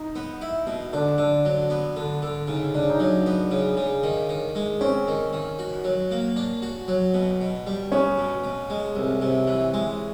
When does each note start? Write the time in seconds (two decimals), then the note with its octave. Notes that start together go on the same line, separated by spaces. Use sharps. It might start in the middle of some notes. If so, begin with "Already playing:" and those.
Already playing: D#4
0.16 B3
0.41 E4
0.67 B2
0.93 D3 D4
1.18 D3 D4
1.45 F#3 D4
1.70 B3
1.96 D3
2.22 D3
2.48 C#3 D#4
2.75 C#3 D4
2.90 D#4
3.00 F#3 D4
3.26 B3
3.51 C#3
3.77 C#3
4.03 D#3
4.29 D#3
4.55 G#3
4.81 C4 C#4
5.08 D#3
5.33 D#3
5.59 F#4
5.84 F#3
6.11 A#3
6.36 D4
6.62 F#4
6.88 F#3
7.14 B2
7.41 B2
7.67 G3
7.92 B3 C#4
8.17 B2
8.44 B2
8.70 G#3
8.96 C2
9.22 C3
9.47 E3
9.74 G#3